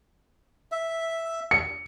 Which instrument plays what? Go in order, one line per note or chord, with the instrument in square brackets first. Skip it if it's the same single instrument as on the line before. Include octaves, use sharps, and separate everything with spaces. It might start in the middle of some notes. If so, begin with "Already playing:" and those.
[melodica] E5
[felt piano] C#7